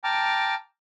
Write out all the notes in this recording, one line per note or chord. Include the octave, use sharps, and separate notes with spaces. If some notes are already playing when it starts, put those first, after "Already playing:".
G5 A5 A#5 D6 F6